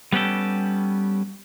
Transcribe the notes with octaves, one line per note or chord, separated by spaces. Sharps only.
G3 B3 C#4 G4 A4